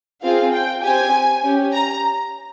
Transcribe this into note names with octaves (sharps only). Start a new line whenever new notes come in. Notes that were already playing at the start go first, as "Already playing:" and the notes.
C4 F4 G#4 F5
G5
C4 G4 G#5
C#4 G4
A#5